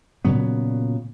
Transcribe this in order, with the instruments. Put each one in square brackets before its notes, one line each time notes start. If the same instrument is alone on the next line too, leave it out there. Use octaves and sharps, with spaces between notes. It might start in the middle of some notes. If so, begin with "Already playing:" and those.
[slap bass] A#2 C#3 F#3 B3